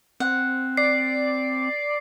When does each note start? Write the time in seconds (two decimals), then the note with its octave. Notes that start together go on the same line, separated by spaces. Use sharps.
0.20 C4 F#5
0.77 D5 C7